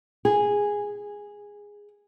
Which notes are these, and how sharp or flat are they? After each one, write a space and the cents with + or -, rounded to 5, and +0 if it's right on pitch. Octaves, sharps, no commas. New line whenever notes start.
G#4 -10